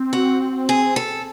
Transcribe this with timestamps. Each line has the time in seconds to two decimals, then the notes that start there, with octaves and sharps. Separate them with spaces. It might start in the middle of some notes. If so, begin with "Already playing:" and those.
Already playing: C4
0.13 F#4
0.69 G#4
0.96 A4